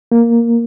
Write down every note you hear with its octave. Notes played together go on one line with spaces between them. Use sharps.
A#3